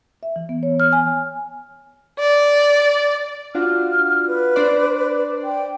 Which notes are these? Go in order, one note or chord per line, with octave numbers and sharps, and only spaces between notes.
E5
E3
B3
C#5
F6
G#5
D5
D4 F4 F#4 F6
B4
D4 C5 D5
G5